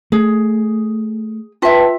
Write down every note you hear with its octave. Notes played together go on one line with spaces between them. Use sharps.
A3 G#4
F4 B4 E5 G5 A5